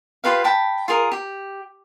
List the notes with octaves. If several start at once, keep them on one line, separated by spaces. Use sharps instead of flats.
F4 G4 B4 F5
G5 A5 B5
F4 G#4 A#4
G4